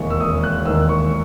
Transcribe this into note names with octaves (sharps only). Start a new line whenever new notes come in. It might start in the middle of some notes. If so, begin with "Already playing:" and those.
Already playing: E1 D#2 D#3 G#3 C#6
E6
E1 D#6
F#6
D#2 D#3 G#3 E6
C#6